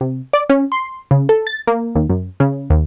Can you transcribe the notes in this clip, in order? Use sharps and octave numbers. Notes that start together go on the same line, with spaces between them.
C3
D5
C#4
C6
C#3
A4
A6
A#3
D#2
F#2
C#3
D#2